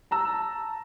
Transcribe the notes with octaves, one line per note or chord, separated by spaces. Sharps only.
A5 A#5 E6